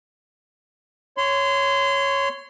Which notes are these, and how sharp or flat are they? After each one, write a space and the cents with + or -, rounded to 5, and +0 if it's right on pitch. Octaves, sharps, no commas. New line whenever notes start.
C#5 +0 C6 -25